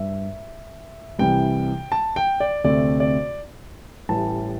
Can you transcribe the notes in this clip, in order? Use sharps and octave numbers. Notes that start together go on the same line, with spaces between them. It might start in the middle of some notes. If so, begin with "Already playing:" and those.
Already playing: G2 E5
C2 C3 E3 G3 G5
A5
G5
D5
D2 C3 A3 C4 D5
D5
A1 A2 E3 G3 A5